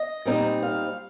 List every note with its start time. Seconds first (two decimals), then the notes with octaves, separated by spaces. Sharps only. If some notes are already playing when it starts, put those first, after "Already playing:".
Already playing: D#5
0.25 A#2 G3 C4 D#4
0.63 F5